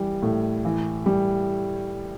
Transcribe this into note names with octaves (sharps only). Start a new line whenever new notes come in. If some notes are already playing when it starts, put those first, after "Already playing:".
Already playing: E3 G3
A2
E3
G3